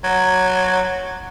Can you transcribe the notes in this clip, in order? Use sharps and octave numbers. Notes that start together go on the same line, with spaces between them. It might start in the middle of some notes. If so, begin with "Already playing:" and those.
F#3